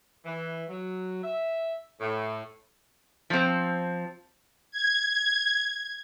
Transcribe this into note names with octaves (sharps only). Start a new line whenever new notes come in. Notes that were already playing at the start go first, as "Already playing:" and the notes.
E3
F#3
E5
A2
F3 C4
G#6